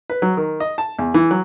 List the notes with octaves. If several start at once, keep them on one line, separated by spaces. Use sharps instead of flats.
B4
F#3
D#3
D#5
A5
E2
E3
F#3